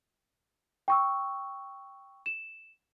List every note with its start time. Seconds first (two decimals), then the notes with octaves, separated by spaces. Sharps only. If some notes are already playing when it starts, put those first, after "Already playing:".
0.88 G5 C#6 E6
2.26 E7